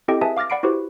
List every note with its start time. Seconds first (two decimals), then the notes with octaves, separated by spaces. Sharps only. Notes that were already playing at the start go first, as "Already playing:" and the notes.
0.08 C4 E4 G4 A4 D#5 G5
0.21 G#4 B4 E5 G#5 A5
0.37 F5 D6 F6 A6 A#6
0.50 D5 F#5 B5 C7 D7
0.63 E4 F#4 G4 B4 C5